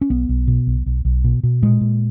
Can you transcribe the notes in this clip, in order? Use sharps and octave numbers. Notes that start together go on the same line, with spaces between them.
C#4
B1 B3
B1
B2
B1
B1
B1
B2
B2
A#2 G#3
A#2